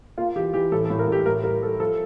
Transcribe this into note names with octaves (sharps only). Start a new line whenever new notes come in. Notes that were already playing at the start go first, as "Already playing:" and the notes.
A#3 F4
E3 G4
E3 G4
A2 A4
A4
A2
A#4
A2 G4
A2 A#4
G3 A#4
G3 A4
F3 A4